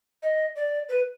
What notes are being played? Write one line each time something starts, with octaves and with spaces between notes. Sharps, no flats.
D#5
D5
B4